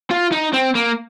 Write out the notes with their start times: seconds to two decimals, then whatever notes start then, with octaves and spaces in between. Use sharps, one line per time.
0.11 F4
0.32 D#4
0.53 C4
0.75 A#3